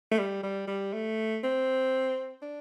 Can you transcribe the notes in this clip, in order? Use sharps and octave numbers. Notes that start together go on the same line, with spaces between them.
A3
G3
G3
G3
A3
C4
D4